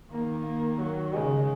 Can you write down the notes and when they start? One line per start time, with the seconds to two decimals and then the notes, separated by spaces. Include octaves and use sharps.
0.12 D#3 A#3
0.46 A#3
0.81 F#3
1.14 C#3 G#3